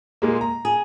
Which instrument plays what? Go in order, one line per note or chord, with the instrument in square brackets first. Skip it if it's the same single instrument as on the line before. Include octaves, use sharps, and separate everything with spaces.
[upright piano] A#2 G#3 A#3
A#5
[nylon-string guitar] G#4